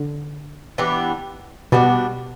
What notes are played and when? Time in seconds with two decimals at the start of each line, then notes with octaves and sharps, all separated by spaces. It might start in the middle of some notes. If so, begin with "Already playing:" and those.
Already playing: D3
0.78 E3 B3 D4 G4
1.72 B2 G3 B3 D4 F#4